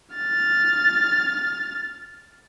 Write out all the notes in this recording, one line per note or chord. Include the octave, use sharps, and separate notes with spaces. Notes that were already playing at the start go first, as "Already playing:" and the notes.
F6 A6